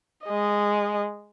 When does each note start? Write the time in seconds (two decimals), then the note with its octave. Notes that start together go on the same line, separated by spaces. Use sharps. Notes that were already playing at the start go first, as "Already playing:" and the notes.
0.25 G#3 D#5